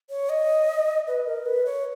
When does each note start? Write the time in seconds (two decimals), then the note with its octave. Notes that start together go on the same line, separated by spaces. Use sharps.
0.10 C#5
0.29 D#5
1.07 B4
1.26 A#4
1.46 B4
1.66 C#5